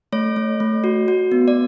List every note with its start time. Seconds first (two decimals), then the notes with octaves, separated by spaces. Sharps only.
0.12 A3 C#5
0.36 A3
0.60 A3
0.84 F#4
1.08 F#4
1.32 B3
1.48 D5